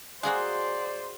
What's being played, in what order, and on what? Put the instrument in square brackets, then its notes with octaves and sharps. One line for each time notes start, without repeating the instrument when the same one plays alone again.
[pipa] G#3 A#3 [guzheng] F#4 G#4 F5 [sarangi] C5 [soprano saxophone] D5